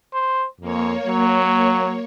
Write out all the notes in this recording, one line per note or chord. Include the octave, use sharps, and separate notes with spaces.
C5
F2 A#3 C#5
F#3